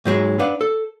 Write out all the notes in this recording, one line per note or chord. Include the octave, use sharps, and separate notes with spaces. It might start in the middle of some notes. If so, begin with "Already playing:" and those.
G#2 F#3 G#3
D4 B4 F5 F#5
A4